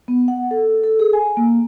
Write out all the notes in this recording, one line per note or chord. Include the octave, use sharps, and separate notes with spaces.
B3
F#5
A4
A4
G#4
G#5
A#3